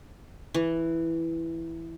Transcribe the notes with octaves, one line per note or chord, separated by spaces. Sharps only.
E3